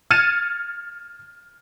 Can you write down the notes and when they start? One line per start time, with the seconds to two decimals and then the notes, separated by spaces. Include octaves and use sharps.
0.11 F6 G#6 A6 C#7 D#7 E7